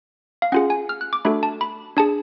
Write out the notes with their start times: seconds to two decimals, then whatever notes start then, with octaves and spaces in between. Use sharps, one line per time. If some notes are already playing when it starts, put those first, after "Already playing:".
0.42 F5
0.52 C#4 F4 G#4 F#5
0.70 G#5
0.89 F6
1.01 F#6
1.13 D6
1.25 A3 D4 F#4 A4 B5
1.43 A5
1.61 B5
1.97 D4 G#4 A5